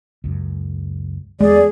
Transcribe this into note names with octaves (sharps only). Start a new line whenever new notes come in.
C#2 F#2
E2 G#3 G#4 D5